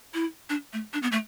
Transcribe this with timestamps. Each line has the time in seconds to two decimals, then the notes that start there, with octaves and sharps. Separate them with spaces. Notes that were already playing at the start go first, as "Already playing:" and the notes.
0.14 E4
0.50 D4
0.73 A3
0.93 D4
1.03 B3
1.12 A3